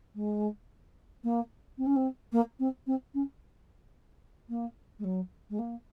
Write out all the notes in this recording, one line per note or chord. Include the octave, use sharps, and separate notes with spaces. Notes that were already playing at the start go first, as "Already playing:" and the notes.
G#3
A#3
C4
C#4
C4
A#3
C4
C4
C#4
A#3
G#3
F#3
G#3
A#3